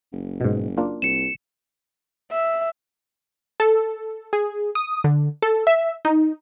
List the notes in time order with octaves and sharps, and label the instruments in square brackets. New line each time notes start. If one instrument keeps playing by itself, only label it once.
[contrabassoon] F#1
[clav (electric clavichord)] G#2 B2
A#3 D4 F4
[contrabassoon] C2 [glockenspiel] C#7 E7
[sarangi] E5
[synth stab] A4
G#4
D#6
D3
A4
E5
D#4